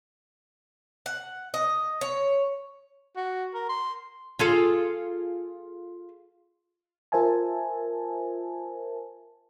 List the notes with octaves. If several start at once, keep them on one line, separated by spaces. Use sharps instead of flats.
F#5
D#5
C#5
F#4
A#4
C6
F4 G#4 A4
F4 A#4 C5 E5 G#5 A5